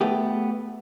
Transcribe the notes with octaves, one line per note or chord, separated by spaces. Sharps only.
A3 B3 G4